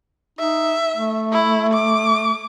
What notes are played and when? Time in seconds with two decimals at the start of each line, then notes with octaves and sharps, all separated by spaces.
0.39 D#4 E5
0.97 A3
1.32 E4
1.74 D6